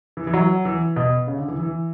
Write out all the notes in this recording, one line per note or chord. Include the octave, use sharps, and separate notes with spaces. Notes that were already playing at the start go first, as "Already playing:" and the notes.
E3
E3
F#3
E3
B2
C#3
D3
E3
E3